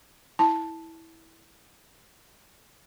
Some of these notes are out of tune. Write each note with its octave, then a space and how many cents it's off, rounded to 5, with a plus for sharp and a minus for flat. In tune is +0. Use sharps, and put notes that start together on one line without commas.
E4 -15 A5 +0